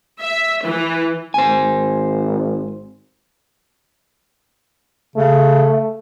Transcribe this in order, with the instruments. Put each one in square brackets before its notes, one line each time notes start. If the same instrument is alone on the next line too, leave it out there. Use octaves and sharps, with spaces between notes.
[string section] E5
E3
[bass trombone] G#1 [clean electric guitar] C5 G#5
[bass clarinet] C#3 [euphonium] A3